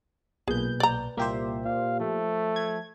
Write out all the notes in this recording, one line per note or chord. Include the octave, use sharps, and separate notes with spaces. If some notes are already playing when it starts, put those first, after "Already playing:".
B1 A#2 G#4 B4 G6
D5 A#5
C2 A#2 A#3 G4 C5 E5
A#2 F5
F3 A3
G#6